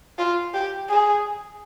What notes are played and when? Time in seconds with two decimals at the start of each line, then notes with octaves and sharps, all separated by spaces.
0.18 F4
0.54 G4
0.89 G#4